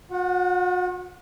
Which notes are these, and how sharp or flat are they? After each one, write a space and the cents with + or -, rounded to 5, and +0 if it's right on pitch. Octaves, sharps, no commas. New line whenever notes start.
F#4 -45 F#5 +0